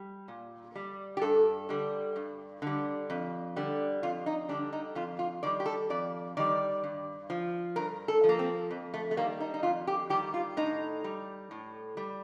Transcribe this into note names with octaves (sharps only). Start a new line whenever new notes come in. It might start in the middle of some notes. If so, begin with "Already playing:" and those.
Already playing: G3
A#2
G3
G4
G2 A4
D3 G3
G2
D3 G3
F2
D3 G3
F2 F4
D#4
D3 G3 D4
D#4
F2 F4
F4
D#3 G3 D5
G4
A4
F2 D5
D#3 G3 D5
G2
F3
G2 A#4
A4
F3
A#3
C4
F2
A3
A3
D#3 G3 A#3
D#4
D#4
F2 F4
G4
D#3 G3 G4
F4
A2 D#4
G3
A2
G3